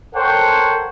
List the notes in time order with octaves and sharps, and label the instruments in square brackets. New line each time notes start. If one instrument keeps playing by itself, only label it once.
[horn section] A4 A#4 C5 C#5 F#5 G5